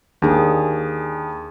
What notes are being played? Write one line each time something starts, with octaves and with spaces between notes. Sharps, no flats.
D#2 D4 G#4